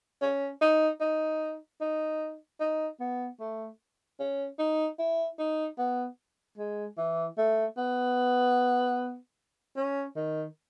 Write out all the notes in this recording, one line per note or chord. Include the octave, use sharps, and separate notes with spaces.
C#4
D#4
D#4
D#4
D#4
B3
A3
C#4
D#4
E4
D#4
B3
G#3
E3
A3
B3
C#4
D#3